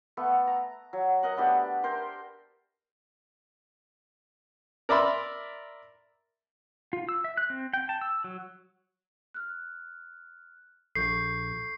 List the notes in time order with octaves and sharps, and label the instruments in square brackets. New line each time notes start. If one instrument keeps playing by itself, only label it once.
[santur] A3 B3
A#5
F#3
A#4 D#5 F#5
A3 B3 D4 G4
A#4 C5 G5
[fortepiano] A#4 D5 E5 B5 C6
[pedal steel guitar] F4
E6
E5
F#6
C4
G5
A5
E6
F#3
[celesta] F6 F#6
[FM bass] A#1 [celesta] A4 C#6 G6 [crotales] C7